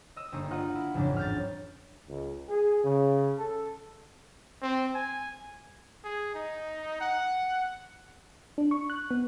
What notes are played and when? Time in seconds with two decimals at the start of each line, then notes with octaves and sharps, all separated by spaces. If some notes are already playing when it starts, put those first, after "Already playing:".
0.16 D#5 E6
0.32 G1 G2 A#3 D#4
0.51 D#4 F4 D#5 F#5
0.75 E4
0.94 A1 F2 G#2 C#3 F#3 D4
1.17 F6 G6 A6
2.09 C#2
2.49 G#4
2.84 C#3
3.39 A4
4.62 C4
4.95 G#5
6.04 G#4
6.35 D#4
7.01 F#5
8.58 D4
8.71 C#6
8.90 F#6
9.11 B3